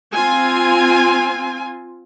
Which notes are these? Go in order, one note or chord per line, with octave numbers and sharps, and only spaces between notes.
C4 F4 G#5